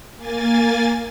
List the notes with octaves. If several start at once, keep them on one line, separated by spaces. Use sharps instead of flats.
A#3 G#5 A6